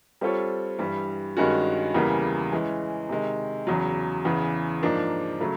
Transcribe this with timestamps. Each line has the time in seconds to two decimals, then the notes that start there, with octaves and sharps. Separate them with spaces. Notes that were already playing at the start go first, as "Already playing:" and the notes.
0.21 G3 C4 F4 A4 C#5
0.79 G2 E3 G3
1.37 G2 D#3 G#3 C#4 F#4
1.94 E2 C#3 E3 G3 A#3
2.52 E3 G#3 C#4
3.09 C3 D#3 G#3
3.67 E2 C#3 F#3
4.25 E2 C#3 E3
4.83 G#2 F3 A#3 D4
5.40 C#3 F#3 A3